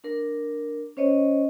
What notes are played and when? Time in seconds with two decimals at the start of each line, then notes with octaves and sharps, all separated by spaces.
0.04 D4 A#4
0.97 C#4 C5 C#5 D#5